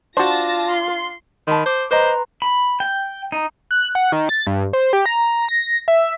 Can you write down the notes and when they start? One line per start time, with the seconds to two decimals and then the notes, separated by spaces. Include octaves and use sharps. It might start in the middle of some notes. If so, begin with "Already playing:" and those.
0.17 D4 F4 F#4 C5 A5 A#6
0.68 C6
1.47 D#3 A5 B5 C6
1.66 C5 D6
1.91 B4 C5 D#5 A#5 C6 D6
2.42 B5
2.80 G5
3.32 D#4
3.71 F#6
3.95 F#5
4.12 D#3
4.29 A6
4.47 G2
4.73 C5
4.93 G4
5.06 A#5
5.48 A#6
5.88 E5